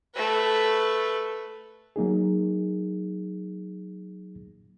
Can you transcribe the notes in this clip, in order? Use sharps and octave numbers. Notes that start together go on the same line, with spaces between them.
A3 B4
F#3 A#3 D#4 G#4